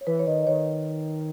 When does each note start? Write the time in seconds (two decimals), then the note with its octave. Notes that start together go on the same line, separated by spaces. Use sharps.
0.01 C#5
0.07 E3 B4
0.19 C#5
0.27 D#3 D#5
0.43 D#5
0.47 D#3 C#5